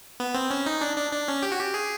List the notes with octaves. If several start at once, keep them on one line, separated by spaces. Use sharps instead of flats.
B3
C4
C#4
D#4
D4
D4
D4
C#4
G4
F#4
G4
G#4